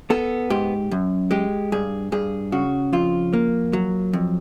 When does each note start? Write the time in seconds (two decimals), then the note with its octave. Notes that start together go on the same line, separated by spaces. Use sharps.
0.10 B3 A4
0.50 G#2 G4
0.91 F#2
1.31 G#3 G4
1.72 G2 G#4
2.12 G2 G#4
2.52 C#3 F#4
2.93 F2 F4
3.33 A#3
3.73 F#3
4.13 F2